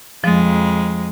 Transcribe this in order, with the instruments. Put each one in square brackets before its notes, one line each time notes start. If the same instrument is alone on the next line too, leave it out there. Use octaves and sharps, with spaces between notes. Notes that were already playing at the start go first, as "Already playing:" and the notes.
[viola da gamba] F2 G#3 [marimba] F3